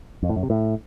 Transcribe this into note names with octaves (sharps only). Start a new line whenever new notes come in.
F2
A2
F#2
C3
A2